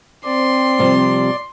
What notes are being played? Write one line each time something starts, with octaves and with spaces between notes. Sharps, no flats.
C4 D5 C6
C3 F3 G3